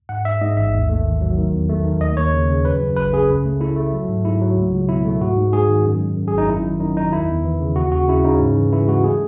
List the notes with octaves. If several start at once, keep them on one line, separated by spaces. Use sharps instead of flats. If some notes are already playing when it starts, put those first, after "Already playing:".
G#2 F#5
G#2 E5
G#2 D#5
A1 E5
D#2
A3
D#3
F#3
D#3
E2
A3
D#3
D#2 D#5
D#2 C#5
C#3
C#3
F#2 B4
F#2
G#1 B4
C#3 G#4
C#2
A3
A3 E4
A3
F#3
G#2
G#2 E4
F#3
C#2
C#2
B2 E4
A3
G#2 F#4
G#2
G#2 G#4
D#3
F#2
G#3
F#2
G#4
G#1
D#4
F#2 E4
D#3
F#2 D#4
D#3 D#4
E2 E4
E2
E3
C#3
D#2 F#4
C#3 F#4
C#3 E4
C#3 D#4
G#2
E3
E3 E4
G#3 F#4
A3 G#4